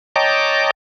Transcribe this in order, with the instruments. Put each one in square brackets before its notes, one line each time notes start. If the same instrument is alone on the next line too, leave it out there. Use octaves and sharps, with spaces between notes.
[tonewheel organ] C#5 D#5 G5 A5 A#5 D6